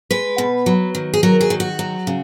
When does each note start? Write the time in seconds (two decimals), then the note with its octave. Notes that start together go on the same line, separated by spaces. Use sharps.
0.11 G#3 B4
0.38 B2
0.66 F#3
0.95 D#3
1.14 G#4
1.23 F#3 A#4
1.41 G#4
1.50 D#3
1.60 F#4
1.79 F#3
2.07 C#3